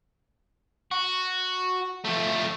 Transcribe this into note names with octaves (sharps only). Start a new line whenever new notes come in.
F#4
F3 A3